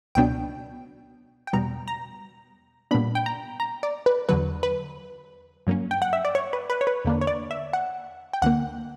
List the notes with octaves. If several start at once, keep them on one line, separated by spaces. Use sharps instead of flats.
C#2 B2 F#3 B3 D4 G5
G5
E2 B2 G3 B3 A#5
A#5
A#2 G3 B3 D4 B5
G5
A#5
A#5
D5
B4
E2 D3 F#3 B4
B4
G2 F#3 A#3 C#4
G5
F#5
E5
D5
C#5
B4
B4
C#5
B4
E2 D3 A#3 D4
C#5
D5
E5
F#5
G5
D2 D3 A#3 F#5